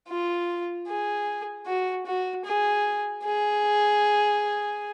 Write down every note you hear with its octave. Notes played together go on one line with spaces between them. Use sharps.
F4
G#4
F#4
F#4
G#4
G#4